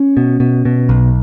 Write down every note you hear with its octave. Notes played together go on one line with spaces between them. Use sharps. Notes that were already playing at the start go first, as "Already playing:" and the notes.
Already playing: C#4
B2
B2
B2
B1